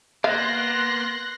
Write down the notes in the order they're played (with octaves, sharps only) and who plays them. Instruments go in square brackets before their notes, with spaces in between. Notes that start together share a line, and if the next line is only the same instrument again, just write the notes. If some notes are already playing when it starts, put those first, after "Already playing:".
[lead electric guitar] A#3 B3 [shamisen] F5 [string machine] C6 F#6 A#6